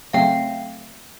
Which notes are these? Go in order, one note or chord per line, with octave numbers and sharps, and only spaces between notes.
C#3 F#3 A3 C4 F5 G5